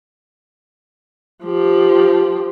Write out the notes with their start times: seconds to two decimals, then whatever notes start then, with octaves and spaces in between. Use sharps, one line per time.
1.44 F3 G4